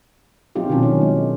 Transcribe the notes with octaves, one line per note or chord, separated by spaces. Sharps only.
F#3 C4 D#4 F4 G4
B2 D#3 F#3 C#4 D4
D#3 F#3
G#3 D4